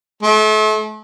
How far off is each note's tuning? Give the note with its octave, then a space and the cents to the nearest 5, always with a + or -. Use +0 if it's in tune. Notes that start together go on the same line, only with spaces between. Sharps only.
A3 -35